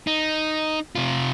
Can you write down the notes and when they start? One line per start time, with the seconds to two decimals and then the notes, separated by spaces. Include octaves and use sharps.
0.07 D#4
0.95 C3 F4